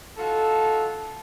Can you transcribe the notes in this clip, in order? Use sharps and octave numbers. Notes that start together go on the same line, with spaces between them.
D#4 F4 F#4 A4